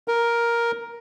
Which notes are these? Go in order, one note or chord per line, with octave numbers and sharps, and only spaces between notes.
A#4